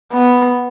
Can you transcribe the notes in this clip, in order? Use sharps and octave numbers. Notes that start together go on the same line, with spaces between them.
B3